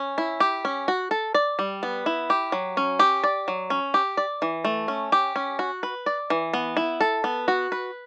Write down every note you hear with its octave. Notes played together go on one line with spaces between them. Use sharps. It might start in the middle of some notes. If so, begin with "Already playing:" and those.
Already playing: C#4
E4
G4
C#4
F#4
A4
D5
G3
B3
E4
G4
F#3
C#4
G4
D5
F#3
C#4
G4
D5
E3
A3
C#4
G4
C#4
F#4
B4
D5
E3
B3
E4
A4
B3
F#4
B4